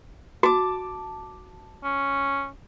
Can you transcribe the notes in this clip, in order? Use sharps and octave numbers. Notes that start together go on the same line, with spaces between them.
F#4 A5 D6
C#4